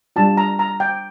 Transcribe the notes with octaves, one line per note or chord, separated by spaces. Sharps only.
G3 D4 F4 A5
A#5
A#5
G5